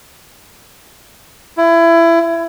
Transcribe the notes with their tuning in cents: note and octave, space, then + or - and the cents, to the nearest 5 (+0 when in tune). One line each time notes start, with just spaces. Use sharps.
E4 +20